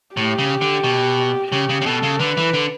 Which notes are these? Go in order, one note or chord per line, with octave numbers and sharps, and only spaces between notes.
A2 G4
C#3
D3
B2
C#3 G4
C#3
C#3
B2 A4
C#3
D3 B4
E3
D3